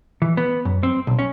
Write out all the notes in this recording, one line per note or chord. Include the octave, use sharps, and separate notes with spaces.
E3
B3
F#2
C4
B1
C#4